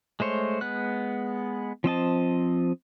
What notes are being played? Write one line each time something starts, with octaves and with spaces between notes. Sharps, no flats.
G#3 A3 C5 C#5
G#3 B3 F#6
F3 C4 D#5 A5